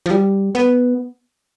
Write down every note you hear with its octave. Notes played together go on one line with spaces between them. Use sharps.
F3
G3
B3